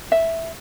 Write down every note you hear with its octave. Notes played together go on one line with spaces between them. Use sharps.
E5